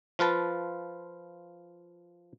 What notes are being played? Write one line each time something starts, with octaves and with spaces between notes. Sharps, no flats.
F3 F4 B4 A5